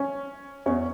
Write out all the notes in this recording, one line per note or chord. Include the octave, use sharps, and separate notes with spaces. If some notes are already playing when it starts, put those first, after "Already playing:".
Already playing: C#4
E2 C#4